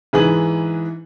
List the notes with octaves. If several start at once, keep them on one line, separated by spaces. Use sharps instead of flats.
G#2 E3 G#4 B4 F#7